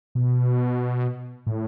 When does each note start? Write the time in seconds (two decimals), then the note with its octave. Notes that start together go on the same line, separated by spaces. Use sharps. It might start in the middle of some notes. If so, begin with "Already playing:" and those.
0.15 B2
1.47 A2